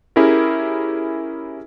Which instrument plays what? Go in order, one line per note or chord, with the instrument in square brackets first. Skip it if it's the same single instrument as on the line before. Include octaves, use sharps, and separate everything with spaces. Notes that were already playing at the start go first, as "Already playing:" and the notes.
[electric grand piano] C#4 E4 G4 G#4 A#4